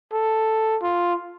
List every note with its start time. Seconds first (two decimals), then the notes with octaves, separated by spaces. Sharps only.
0.13 A4
0.82 F4